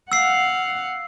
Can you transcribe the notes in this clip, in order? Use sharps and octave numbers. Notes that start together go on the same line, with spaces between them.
F5 F#5 E6 C7